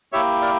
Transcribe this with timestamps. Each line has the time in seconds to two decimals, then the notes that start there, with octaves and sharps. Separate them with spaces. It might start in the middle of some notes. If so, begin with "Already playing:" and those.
0.12 A#3 E4 G4 C#5 E5
0.41 A#4 D5